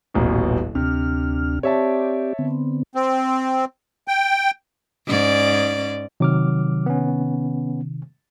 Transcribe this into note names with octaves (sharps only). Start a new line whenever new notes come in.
D#1 A1 B2
D2 C3 D4 F6
C4 G4 C#5 D5 E5 A5
D3 B3 C4
C4
G5
G#2 C#4 D5
C3 D#3 F#3 D6 F6
B3 C#4